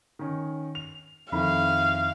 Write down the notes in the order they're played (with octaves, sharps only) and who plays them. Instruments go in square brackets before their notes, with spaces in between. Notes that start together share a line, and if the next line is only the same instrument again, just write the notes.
[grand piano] D#3 C#4
F7
[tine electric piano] F2 [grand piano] D#3 E4 B5 [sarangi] F5